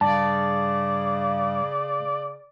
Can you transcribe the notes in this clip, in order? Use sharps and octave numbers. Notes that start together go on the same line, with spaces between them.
G2 C#3 D5 A5